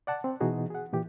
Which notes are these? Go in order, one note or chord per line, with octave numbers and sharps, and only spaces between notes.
D5 F#5 A5
C4
B2 E3 D#4 F#4 G#4
G#4 F#5
A#2 E3 G4